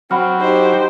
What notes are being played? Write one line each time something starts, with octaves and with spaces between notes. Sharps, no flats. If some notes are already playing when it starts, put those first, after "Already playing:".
F#3 C4 F#5 B5 F6
D#4 G4 C5